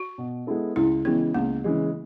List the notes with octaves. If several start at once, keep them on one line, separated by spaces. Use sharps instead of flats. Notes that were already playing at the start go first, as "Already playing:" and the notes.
Already playing: F#4
B2
G#3 B3 E4 A4
C#2 E4
C#3 E3 G#3 B3
C#2 A#3
C#3 E3 G#3